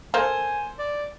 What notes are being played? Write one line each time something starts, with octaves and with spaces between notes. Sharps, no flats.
A#3 A4 C5 G#5
D5